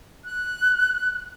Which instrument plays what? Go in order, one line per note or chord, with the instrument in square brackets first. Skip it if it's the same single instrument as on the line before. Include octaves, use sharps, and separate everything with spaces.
[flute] F#6